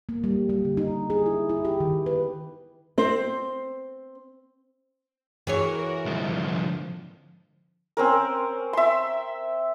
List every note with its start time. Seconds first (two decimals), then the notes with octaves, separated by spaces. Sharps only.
0.09 A#3
0.24 G3
0.49 G3
0.65 D3
0.77 D#4
1.10 G#4
1.26 E4
1.49 E4
1.65 G4
1.80 D#3
2.06 B4
2.98 C4 C5
5.47 E3 F#4 G#4 A#4 C#5
6.05 C2 G#2 D3 F3
7.97 C4 C#4 A#4
8.73 E5 C6